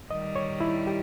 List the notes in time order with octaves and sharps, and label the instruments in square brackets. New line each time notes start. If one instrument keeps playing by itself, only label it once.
[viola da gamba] D#3 G3 [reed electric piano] D#5
[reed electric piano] C#5
E4
G4